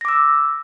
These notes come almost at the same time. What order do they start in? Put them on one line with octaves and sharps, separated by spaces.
A#6 D6 E6